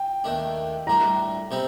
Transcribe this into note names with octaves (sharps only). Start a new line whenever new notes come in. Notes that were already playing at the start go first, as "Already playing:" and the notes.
Already playing: G5
D#2 D#3 A3 D4
A2 G3 D4 A#5
C3 G3 C4 D#4